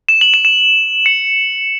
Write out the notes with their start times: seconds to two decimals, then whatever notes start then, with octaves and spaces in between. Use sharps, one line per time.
0.09 E7
0.21 F#7
0.34 E7
0.45 E7
1.06 C#7